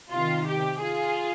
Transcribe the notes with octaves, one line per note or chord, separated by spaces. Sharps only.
C3 D#3 F4
G4
F4 G#4